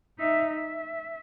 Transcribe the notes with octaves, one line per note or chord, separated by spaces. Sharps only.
D#4 E5
E5